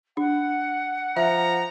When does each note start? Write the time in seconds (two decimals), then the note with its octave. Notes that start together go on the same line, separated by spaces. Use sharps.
0.17 D4 F#5
1.17 F3 E5 A#5